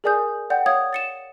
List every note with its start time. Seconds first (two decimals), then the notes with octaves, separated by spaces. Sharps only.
0.04 G#4 A#4 D5 G#5 D#6 G6
0.50 D5 F#5 G5 G6
0.66 C#5 F5 D#6 G#6
0.93 A6 C#7 E7